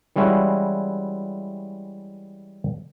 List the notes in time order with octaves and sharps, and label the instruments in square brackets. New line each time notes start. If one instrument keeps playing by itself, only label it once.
[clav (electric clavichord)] E3 G3 G#3 C#4 E4 F#4